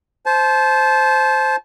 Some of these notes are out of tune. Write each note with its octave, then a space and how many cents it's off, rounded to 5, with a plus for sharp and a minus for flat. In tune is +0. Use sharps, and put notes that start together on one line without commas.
C5 +0 A5 -30